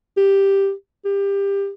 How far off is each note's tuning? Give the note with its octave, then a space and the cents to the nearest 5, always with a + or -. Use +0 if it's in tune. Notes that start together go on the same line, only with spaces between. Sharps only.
G4 +5
G4 +20